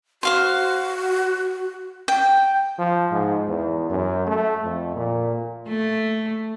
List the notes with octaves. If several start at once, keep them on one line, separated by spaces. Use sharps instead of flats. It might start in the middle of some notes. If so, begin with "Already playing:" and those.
F#4 C5 F5 C6
G5
F3
G#2
E2
F#2
A3
F2
A#2
A3